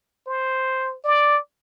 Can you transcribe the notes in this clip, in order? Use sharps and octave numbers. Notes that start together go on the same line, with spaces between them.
C5
D5